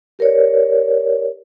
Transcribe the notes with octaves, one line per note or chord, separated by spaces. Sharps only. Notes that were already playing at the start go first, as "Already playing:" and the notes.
G4 A#4 B4 C#5 D5